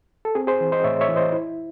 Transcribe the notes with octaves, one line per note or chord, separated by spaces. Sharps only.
A4
C4 G#4
G#4 C5
E3
C5 D#5
A2 C#5 E5
C#5 E5
E3
C5 D#5
E4